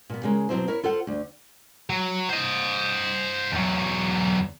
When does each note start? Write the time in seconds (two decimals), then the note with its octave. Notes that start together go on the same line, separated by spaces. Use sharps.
0.10 A#2 B3
0.23 C#3 G#3 A#4
0.49 B2 F#3 C4 E4 C5
0.68 E4 A#4 C#5
0.83 F4 A4 C5 F#5
1.07 D2
1.90 F#3
2.29 C5 D#5
3.52 E2 F#3